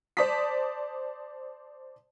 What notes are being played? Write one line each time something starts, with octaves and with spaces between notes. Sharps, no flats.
C5 D5 A5 D#6 B6